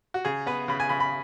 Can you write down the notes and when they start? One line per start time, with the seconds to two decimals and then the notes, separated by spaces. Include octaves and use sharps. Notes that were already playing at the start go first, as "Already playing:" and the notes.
0.14 F#4
0.25 C#3 G#4
0.46 B3 B4
0.68 C#3 B5
0.80 G#5
0.89 C#3 B5
1.00 B5